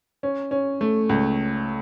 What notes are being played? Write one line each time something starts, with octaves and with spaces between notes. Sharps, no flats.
C#4
C#4
A3
C#2